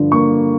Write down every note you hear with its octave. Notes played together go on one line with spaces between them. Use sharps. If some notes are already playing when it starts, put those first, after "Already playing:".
Already playing: G2 D3 F3
A#3 C#6